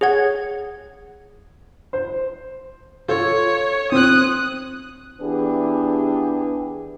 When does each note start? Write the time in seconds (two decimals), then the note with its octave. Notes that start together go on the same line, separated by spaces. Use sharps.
0.01 G#4 C#5 F#5 G#6
1.93 C5
3.09 F4 A4 C#5
3.92 C4 D#6 F#6
5.21 E3 B3 D4 G4 G#4